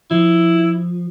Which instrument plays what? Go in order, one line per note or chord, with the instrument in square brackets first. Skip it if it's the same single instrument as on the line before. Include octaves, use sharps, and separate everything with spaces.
[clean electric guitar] F3 [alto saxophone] E4